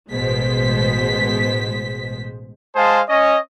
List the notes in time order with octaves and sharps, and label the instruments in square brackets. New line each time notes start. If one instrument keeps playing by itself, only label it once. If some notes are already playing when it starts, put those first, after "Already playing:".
[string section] A1 B2 G#3 C5 B6
[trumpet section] G#3 G#4 C5 F5 A5
C#4 C#5 D#5